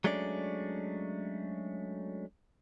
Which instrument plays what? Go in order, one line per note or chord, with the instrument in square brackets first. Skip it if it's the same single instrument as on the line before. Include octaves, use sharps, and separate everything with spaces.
[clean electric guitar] F#3 G#3 A3 C#4 D4 D5